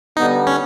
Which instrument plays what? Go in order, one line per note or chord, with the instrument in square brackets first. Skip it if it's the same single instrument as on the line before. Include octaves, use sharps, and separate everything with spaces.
[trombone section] D3 G3 B3 [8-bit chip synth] D#4
[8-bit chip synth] C#4